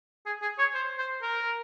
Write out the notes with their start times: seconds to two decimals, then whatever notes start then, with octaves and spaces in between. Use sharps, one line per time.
0.26 G#4
0.42 G#4
0.59 C#5
0.74 C5
0.98 C5
1.22 A#4